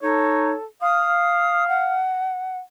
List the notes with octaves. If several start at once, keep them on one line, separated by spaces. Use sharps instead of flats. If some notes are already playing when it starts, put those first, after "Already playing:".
D#4 A4 C#5
F5 D#6
F#5